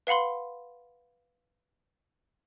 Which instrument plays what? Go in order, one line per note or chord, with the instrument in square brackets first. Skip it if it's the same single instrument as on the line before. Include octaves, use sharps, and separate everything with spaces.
[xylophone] B4 F5 F#5 B5 C6